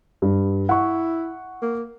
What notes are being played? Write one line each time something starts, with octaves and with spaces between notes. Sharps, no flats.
G2
E4 F#5 C#6
A#3